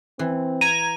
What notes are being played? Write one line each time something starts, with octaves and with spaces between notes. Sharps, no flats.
E3 C4
A#5 G#6 D#7